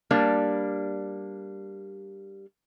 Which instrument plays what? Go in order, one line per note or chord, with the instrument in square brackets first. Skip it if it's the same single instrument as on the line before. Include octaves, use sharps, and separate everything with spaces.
[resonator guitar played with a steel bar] G3 A#3 D4